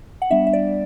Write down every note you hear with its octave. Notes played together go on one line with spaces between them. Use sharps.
F#5
G3 B3 D4 E5
E5
D5